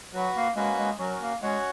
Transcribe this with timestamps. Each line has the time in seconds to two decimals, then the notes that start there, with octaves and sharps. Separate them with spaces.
0.13 F#3 F#4 B4 F#5
0.35 A#3
0.56 G#3 A#3 C#4 F#4 B4
0.77 G#3
0.99 F#3 C#4 F#4 A#4
1.20 A#3
1.42 G#3 C#4 F#4 C#5 F#5